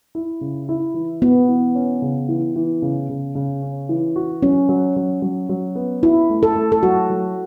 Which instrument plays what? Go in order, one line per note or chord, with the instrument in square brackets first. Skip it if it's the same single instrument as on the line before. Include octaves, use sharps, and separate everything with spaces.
[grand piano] E4
C#3
E4
E3
[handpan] B3 [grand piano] F#4
[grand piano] E3
C#4
C#3
E3
E3
C#3
C#3
C#3
C#4
E3
F#4
[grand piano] F#3 [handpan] C#4
[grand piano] F#3
F#3
F#3
F#3
B3
[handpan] E4 [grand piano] F#4
[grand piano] A3
[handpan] A4
[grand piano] A3
[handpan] A4
[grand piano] F#3 [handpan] F#4
[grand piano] F#3